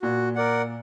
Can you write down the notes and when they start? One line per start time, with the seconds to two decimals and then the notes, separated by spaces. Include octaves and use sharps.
0.02 A#2 F#4
0.36 A#4 D5 F#5